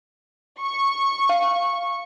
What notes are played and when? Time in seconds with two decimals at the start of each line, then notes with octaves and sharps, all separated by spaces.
0.61 C#6
1.29 F5